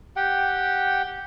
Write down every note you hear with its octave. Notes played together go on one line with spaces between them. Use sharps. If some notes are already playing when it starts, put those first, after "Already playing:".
G4 F#5 G5